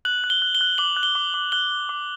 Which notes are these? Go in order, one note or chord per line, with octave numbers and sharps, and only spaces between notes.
F#6 F#7
F#6
G7
F#6
G7
F#6
D6 F#7
F#6
G7
D6
D6
F#6 G7
F#6
D6